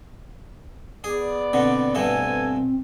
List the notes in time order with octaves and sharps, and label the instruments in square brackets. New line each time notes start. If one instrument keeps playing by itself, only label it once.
[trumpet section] B3 D5 [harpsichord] G#4
[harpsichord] B2 D3 [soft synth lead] C4
[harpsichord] G2 B2 A3 [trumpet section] A4 G#5